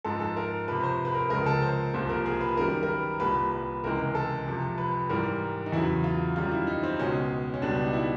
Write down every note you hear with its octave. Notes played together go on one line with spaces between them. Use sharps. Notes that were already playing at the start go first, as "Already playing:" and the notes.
G#2 F3 G#3 A4
A4
A#4
F2 C3 F3 B4
C5
B4
A#4
C#2 C#3 F3 G#3 A#4
A4
C5
C2 A#2 F3 C5
A#4
G#4
B4
F#2 D#3 G3 A#4
A#4
B4
C2 A#2 G3 B4
B4
C#2 C3 E3 G#3 A#4
A4
F2 C3 F3
B4
G#2 E3 G3 A#4
D#4
E2 C#3 F#3 E4
F4
F#2 D#3 G3 F4
E4
D#4
C4
C#2 B2 G#3 C#4
C#4
C#2 B2 G3 D4
D#4
E4